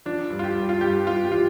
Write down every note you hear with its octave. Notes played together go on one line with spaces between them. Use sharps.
F3 D4
G2
F4
G4
G2
F4
G2 G4
G2 F4
G4
F3 F4